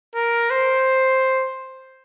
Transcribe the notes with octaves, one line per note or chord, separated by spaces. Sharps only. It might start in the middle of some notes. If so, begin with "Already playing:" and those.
A#4
C5